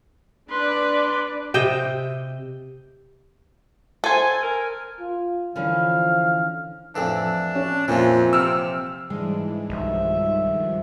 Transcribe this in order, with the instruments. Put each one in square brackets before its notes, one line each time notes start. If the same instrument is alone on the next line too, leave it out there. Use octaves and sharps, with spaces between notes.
[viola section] D4 D5 [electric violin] B4 [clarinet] C6
[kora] C3 D#5 E5 G5
[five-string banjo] A4 C5 [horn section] G#5
[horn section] A#4 G#5
[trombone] F4
[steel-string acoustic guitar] D3 E3 C#4 [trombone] F3 [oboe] F5
[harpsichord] F2 A2 E3 [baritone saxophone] D4
[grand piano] C#4
[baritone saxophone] F2 [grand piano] A#2 [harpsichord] E3 F3
[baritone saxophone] C3 [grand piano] E6 F6
[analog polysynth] G#2 E3 [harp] G#3 [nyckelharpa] D4
[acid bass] B1 [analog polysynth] G2 D#3 F3 [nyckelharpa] E5